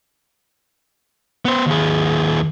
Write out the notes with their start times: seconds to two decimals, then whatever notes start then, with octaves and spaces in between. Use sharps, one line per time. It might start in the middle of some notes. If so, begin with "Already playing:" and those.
1.45 B3 C5
1.66 D#2 G#4